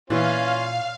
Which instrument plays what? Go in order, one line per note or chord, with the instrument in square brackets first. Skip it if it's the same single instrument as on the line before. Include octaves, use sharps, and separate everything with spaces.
[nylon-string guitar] A#2 [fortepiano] E3 [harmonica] C#4 F4 [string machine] F5